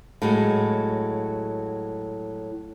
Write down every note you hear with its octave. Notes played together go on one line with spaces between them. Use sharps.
A2 F#3 G#3